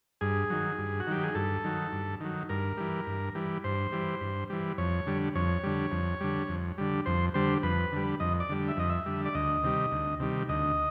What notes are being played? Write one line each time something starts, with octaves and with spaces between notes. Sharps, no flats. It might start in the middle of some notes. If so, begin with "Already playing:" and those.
G2 G#4
D#3 F#3
G2
F#4
D#3 F#3 G4
G#4
G2 A4
D#3 F#3
G2
D#3 F#3
G2 A#4
E3 G3
G2
E3 G3
G2 C5
E3 G3
G2
E3 G3
F2 C#5
D3 G3
F2 C#5
D3 G3
F2
D3 G3
F2
D3 G3
F2 C5
D3 G3 C5
F2 B4
D3 G3
F2 D#5
D5
D3 G3
E5
F2 D#5
E5
D3 G3
D5
D2 D#5
C3 D#3 G3
D2
C3 D#3 G3
D2 D#5